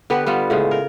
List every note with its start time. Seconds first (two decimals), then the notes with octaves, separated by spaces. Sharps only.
0.10 D3 B3 G4 B4
0.27 G3 B3 F4
0.50 A2 C#3 G#3
0.71 A#4